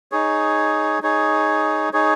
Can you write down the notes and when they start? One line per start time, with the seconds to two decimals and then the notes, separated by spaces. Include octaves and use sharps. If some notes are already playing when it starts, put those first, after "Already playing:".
0.12 D#4 G#4 C#5
1.02 D#4 G#4 C#5
1.93 D#4 G#4 C#5